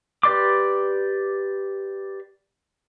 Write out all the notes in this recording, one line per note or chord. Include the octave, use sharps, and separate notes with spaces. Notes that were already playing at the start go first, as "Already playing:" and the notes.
G4 B4 D5 C6 D6